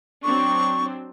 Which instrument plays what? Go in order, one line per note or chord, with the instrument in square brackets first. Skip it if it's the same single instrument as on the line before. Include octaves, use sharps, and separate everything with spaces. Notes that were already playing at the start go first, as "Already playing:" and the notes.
[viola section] F#3 C4 D4 [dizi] C#6